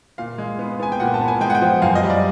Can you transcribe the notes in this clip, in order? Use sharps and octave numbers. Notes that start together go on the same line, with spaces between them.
A#2 F5
G#3
B3
B3 G#5
G5
A#2 F#5
A5
B3
G#5
G#3 G5
F#5
G5
F3
F#2 F5
D#5
G3
D5